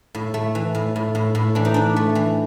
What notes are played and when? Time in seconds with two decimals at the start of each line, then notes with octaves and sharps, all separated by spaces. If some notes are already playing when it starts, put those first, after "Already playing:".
0.15 A2
0.34 A3
0.55 E3
0.75 A2
0.96 A2
1.15 A2
1.35 A2
1.55 E3 D4
1.65 D#4
1.74 E3 D4
1.96 A3
2.15 E3